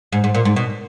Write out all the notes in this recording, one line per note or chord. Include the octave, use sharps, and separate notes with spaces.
G#2
G#2
A#2
G#2
B2